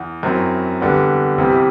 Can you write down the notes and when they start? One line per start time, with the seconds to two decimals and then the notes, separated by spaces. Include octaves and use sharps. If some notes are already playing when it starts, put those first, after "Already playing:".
Already playing: E2
0.23 F#2 F#3 C4 E4
0.80 E2 D3 G3 B3
1.38 E2 C3 G3 C4 E4